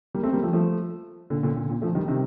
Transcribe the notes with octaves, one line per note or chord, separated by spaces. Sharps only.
G3 A#3
A3 C4
G3 A#3
F3 A3
F3 A3
A#2 D3
A#2 D3
A#2
A#2
F3 A3
D#3 G3
C3 D#3